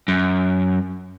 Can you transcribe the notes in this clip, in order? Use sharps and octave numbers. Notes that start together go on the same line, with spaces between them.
F#2